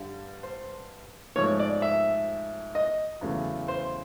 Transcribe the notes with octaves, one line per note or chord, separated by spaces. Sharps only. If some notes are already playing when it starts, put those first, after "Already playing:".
Already playing: G2 D3 G3
C5
G#2 F3 A3 C#5
D5
E5
D#5
E2 C#3 F#3 A3
C5